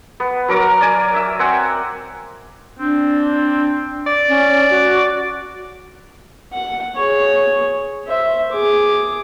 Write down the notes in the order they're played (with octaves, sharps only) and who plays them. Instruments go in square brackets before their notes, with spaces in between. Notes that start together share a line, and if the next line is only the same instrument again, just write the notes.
[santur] B3
F#3 A#4 A#5 D6
D5 G#5
E5 E6
C4 F#5 G#5 E6
[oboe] C4 [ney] D4
[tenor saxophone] D5
[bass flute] C#4
F#4
[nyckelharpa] F#5
G#4 C#5
C5 E5
G#4 D6